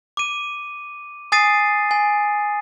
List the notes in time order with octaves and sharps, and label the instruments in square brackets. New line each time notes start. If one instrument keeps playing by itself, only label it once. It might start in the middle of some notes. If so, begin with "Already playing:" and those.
[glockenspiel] D6 D#7
G#5 D#6 A6 C7 D#7
G#5